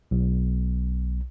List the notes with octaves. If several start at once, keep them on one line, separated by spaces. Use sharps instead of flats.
B1